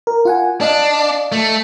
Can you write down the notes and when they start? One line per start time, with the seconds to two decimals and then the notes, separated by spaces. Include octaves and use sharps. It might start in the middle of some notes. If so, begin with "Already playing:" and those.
0.07 A#4
0.25 F4 F#5 G#5
0.61 D4 D5 D#5 F5
1.32 A3